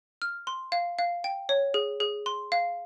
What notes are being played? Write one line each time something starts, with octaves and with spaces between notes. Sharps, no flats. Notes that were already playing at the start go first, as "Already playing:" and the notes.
F6
C6
F5
F5
G5
C#5
G#4
G#4
C6
F5